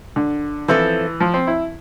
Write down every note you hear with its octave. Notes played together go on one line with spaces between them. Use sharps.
D3
E3 F3 C4 E4 A4
F3
C4
E4